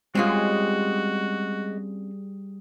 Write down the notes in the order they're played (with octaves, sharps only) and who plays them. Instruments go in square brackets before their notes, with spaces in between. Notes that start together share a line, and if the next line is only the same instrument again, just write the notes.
[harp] G3 G#4 [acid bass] G#3 [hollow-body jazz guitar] C4 C#4 F4 [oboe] F#4